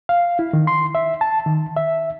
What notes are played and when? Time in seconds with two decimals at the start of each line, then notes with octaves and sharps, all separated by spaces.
0.09 F5
0.39 E4
0.53 D#3
0.67 C6
0.95 E5
1.21 A5
1.46 D#3
1.76 E5